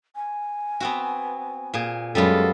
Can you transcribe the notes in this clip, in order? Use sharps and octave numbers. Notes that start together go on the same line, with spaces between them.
G#5
B3 C4 F#4
A#2 G#4
F#2 G3 G#3 B3 F4 A4